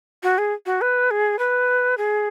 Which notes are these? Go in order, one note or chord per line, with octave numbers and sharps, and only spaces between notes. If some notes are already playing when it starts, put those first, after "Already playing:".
F#4
G#4
F#4
B4
G#4
B4
G#4